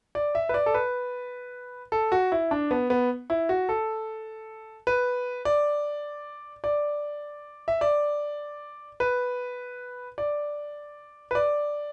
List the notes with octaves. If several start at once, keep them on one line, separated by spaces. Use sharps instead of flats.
D5
E5
B4
D5
A4
B4
A4
F#4
E4
D4
B3
B3
E4
F#4
A4
B4
D5
D5
E5
D5
B4
D5
B4
D5